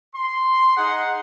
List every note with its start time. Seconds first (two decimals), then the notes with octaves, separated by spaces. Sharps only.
0.14 C6
0.76 D#4 G#4 F#5